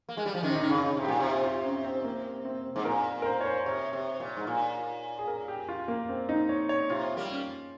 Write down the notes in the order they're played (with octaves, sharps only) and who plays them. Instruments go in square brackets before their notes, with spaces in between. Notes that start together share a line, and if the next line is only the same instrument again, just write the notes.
[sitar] A#3
G#3
G3
F3
[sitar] C3 D#3 [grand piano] C#4
[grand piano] D#4
[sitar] D#3 [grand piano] C#4
[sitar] C#3
[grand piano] D#4
[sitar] C3
[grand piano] G4
[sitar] A#2
[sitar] C3 [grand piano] F4
[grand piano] F4
C#4
C4
A#3
C4
[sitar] G#2
[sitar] A#2 [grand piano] A#4
[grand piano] A#4
C5
C#5
C5
[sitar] C3 [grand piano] C#5
[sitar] C3
A#2
G#2
A#2
[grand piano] G#4
A#4
G4
F4
A#3
C4
D#4
C#5
C#5
[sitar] C3 [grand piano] F4
[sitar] G3 A#3
[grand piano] C#4